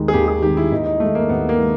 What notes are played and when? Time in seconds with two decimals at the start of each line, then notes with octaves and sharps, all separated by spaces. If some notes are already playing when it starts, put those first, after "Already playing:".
Already playing: D#2 D#3 G#3
0.08 G#4
0.13 D#2 G4
0.28 G#4
0.42 D#3 G#3 G4
0.57 E4
0.72 D#2 D#4
0.86 D#4
1.00 D#3 G#3 A3
1.15 A#3
1.29 D#2 B3
1.49 A#3
1.59 D#3 G#3